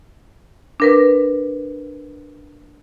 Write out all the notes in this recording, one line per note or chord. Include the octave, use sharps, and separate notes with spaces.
D4 A#4 B4